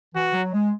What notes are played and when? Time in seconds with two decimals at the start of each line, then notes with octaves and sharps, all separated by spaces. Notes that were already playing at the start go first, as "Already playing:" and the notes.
0.15 E3 F#4
0.34 F#3
0.53 G#3